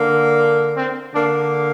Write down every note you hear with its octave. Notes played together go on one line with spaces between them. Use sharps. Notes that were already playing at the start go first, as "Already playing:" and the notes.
Already playing: D3 A#3
C4
D3 A#3 D4